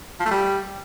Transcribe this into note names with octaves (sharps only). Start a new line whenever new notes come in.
F3
A3
G3